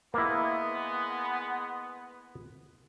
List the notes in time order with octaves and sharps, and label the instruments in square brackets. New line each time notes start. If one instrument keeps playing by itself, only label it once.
[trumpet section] G#3 B3 [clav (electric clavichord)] A#3 E4